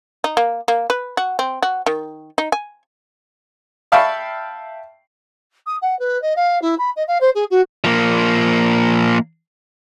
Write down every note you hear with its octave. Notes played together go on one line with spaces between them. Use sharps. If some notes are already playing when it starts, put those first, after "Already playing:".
D#4
A#3
A#3
B4
F#4
C4
F#4
D#3
D#4
G#5
E5 F5 G5 A5 B5 C#6
D#6
F#5
B4
D#5
F5
E4
B5
D#5
F5
C5
G#4
F#4
F3 A#3